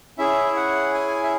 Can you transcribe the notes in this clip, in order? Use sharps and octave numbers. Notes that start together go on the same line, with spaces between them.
C#4 E4 G#4 E5
F#5
G#5
E5